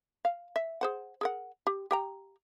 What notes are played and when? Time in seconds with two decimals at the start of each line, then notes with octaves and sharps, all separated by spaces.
0.25 F5
0.56 E5
0.81 G#4 C5 F#5
1.21 G#4 A#4 F#5
1.67 G4
1.91 G4 G5 A#5